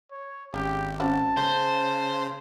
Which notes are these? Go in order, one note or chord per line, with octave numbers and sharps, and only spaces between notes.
C#5
G#1 C#3 G4
C4 C#4 F#4 A5
C#3 C#4 C5